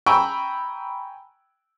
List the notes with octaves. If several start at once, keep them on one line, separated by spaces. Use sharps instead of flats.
G5 G#5 A#5 B5 C#6 E6